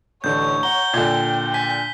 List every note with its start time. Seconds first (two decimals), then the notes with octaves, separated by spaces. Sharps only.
0.24 A1 D3 C#5 G6
0.63 F#5 A#5 G7
0.94 A#2 D3 G5 G#6
1.54 G#5 B6